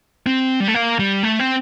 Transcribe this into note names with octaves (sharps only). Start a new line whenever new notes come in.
C4
G3
A3
A#3
G3
A3
C4